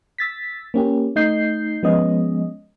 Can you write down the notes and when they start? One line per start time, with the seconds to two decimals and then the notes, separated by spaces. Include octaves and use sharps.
0.18 E6 A6 B6
0.74 A#3 C#4 G4
1.16 A3 D#4 D#5 G6 C7
1.83 F3 G#3 B3 C#4 D#5